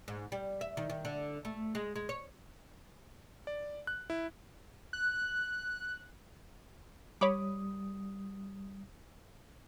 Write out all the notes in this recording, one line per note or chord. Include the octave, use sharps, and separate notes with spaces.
G#2
G3
E5
D#3
D#3
D3
A3
G#3
G#3
C#5
D5
F#6
E4
F#6
G3 C#5 B5 D6 D#6